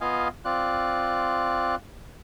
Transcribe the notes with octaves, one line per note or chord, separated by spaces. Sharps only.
B3 F4 D#5 F5 G#5
C4 F4 D5 F#6